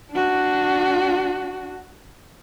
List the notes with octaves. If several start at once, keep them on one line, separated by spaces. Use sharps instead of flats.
D4 F#4